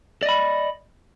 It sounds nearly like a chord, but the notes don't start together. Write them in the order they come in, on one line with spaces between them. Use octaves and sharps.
D5 D#5 B5